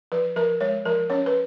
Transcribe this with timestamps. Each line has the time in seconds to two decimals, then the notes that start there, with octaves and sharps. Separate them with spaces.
0.12 F3 B4
0.36 F3 A#4
0.61 G#3 C#5
0.85 F3 A#4
1.10 C#4 C#5
1.26 B4